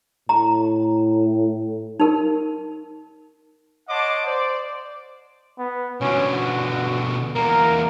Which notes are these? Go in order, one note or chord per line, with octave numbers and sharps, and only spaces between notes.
A2 A#5
D#4 A#4
C#5 D#5 F#5 A5 C6 D6
C5 D5
B3
B2 D3 C#4
F#4
E2 A#3 A#4